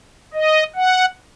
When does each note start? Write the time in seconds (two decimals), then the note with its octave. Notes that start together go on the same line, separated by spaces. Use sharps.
0.34 D#5
0.76 F#5